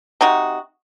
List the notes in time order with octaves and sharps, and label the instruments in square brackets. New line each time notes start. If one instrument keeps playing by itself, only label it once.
[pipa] C3 D#4 F#4